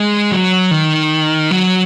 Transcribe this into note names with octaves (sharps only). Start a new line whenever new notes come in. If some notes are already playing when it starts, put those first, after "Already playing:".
Already playing: G#3
F#3
D#3
F#3